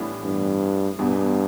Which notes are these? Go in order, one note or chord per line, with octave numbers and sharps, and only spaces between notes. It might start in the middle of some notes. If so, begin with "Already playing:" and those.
Already playing: A2 E3 G3 B3 D4
G2
E2 G2 B2 B3